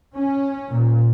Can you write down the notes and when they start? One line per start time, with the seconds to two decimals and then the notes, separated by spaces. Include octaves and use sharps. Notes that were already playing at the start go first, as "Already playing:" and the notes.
0.14 C#4
0.71 A#2